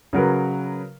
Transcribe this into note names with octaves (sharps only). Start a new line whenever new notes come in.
C#3 F#3 A#4 B4